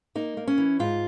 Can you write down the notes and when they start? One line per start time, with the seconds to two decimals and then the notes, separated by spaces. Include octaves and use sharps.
0.15 A#3 D#4
0.37 A#3
0.47 C#4
0.58 E3
0.79 G#2 F4